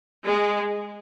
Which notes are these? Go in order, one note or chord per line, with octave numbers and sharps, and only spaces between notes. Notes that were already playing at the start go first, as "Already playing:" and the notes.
G#3